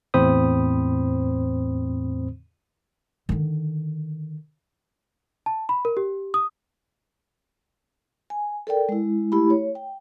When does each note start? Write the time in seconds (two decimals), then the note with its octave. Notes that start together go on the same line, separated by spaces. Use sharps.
0.14 E2 A2 C4 C5 B5 D#6
3.29 D3 D#3
5.46 A5
5.69 B5
5.85 A#4
5.97 G4
6.34 D#6
8.30 G#5
8.67 A4 A#4 D5 G5
8.89 G#3 E4
9.32 A3 E4 G4 B5
9.50 C#5
9.75 G5